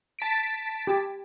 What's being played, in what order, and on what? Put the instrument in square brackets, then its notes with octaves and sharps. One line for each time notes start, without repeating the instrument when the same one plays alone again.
[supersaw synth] A5 B6 D7
[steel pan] G4